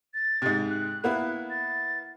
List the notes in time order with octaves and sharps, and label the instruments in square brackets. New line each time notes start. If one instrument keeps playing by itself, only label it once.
[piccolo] A6
[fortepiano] G#2 C3
[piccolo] F#6
[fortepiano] A#3 B3 E4
[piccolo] A6